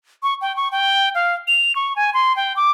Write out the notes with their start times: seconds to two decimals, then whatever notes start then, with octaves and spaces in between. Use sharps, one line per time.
0.23 C#6
0.41 G5
0.56 C#6
0.72 G5
1.15 F5
1.48 F7
1.75 C#6
1.96 G#5
2.14 C6
2.36 G5
2.56 D6